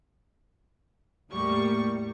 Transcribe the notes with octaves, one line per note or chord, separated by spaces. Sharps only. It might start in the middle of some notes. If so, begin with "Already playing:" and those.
E2 A2 G3 A#3 C#6